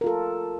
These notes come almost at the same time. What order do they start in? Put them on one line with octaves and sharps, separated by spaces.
A#4 F4 A4